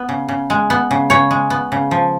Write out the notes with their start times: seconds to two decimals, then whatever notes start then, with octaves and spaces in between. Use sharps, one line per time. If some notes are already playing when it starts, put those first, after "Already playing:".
Already playing: B3
0.09 C#3
0.28 C#3
0.50 G#3
0.70 B3
0.91 C#3
1.10 C#3 C#5
1.31 G#3
1.50 B3
1.72 C#3
1.91 F3